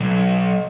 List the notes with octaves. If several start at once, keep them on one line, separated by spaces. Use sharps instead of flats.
B1